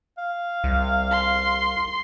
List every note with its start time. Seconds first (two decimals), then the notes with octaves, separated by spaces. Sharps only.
0.18 F5
0.64 C2
1.12 C6